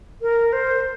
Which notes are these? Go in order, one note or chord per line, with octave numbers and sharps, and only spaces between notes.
A#4
C5